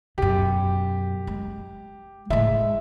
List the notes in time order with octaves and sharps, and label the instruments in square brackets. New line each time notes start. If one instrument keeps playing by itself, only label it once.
[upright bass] F#2 B2 [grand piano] G4
[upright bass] G#3
[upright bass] A2 G#3 [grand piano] E5